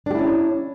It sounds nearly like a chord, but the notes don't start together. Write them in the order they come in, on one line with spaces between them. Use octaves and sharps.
D4 G4 E4 C#4